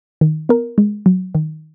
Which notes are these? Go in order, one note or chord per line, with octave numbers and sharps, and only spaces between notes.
D#3
B3 A#4
G#3
F#3
D#3